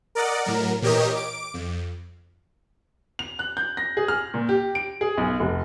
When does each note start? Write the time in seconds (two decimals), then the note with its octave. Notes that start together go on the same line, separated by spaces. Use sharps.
0.15 A#4 D5 D#5 F#5
0.45 A2 F#3 A#4
0.82 A#2 E3 G4 A#4 C#5 D#5
1.15 D6 D7
1.54 F2
3.19 F7
3.39 F#6
3.57 G6
3.77 A#6
3.97 G#4
4.08 F6
4.34 A#2
4.49 G4
4.75 D7
5.01 G#4
5.18 B1
5.40 F1